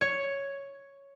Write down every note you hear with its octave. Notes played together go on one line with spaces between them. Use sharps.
C#5